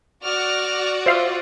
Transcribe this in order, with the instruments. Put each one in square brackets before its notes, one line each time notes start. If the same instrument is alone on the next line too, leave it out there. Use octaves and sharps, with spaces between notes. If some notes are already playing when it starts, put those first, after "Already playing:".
[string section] F#4 D5 [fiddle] F6
[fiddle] F4 [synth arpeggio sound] C5 E5 F5